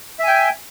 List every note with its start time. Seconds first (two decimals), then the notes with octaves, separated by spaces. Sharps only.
0.20 E5
0.24 G#5
0.28 G5